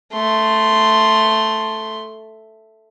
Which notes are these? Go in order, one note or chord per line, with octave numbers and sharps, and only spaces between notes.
A3 C6